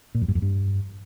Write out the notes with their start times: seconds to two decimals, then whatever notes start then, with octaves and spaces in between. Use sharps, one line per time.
0.15 A#2
0.22 F2
0.28 G2
0.35 F2
0.42 G2